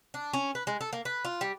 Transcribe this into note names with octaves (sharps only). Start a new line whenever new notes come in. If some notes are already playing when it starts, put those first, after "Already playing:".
D4
C#4
B4
G#3
A4
A#3
B4
F4
G3